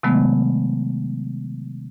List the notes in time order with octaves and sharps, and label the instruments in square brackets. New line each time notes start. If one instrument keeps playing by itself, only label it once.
[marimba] C3 D#3 F#3 G#3 A3 B3